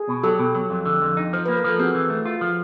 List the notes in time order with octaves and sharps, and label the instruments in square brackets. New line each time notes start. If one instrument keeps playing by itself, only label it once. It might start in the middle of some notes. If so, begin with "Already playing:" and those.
Already playing: [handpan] G#4
[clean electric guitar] B2
[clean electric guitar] F#3 [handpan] G4 A4
[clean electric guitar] B2
F#3
F2
D3
F2
D#4
[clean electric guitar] F3 [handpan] C5
[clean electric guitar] A#3 [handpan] B4
[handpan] A#4
[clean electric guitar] F3 [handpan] A4
[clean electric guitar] C4 [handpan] F#4 G#4
[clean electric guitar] E3
A3
F4
F3